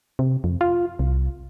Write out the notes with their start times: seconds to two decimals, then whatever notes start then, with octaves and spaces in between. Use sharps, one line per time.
0.19 C3
0.44 F2
0.61 F4
0.99 C2